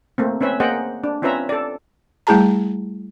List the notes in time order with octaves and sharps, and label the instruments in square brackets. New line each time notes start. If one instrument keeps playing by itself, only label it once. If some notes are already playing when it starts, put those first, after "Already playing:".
[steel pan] A3 A#3 C4
C4 C#4 B4 E5
A#3 G#4 C5 D#5 F#5 G5
D4
C4 C#4 F4 B4 E5 A#5
A4 D5
[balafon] G3 A3 E4 G#4 A5 A#5